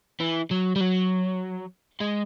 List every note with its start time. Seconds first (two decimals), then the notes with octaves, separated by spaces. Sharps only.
0.20 E3
0.51 F#3
0.76 G3
0.81 F#3
2.01 G#3